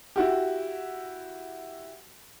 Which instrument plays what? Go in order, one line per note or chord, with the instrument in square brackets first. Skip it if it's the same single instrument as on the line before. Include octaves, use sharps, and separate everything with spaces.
[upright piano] E4 F#4 G4